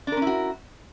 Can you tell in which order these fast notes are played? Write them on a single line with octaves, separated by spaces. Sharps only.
D4 A#4 C#4 E4 F#4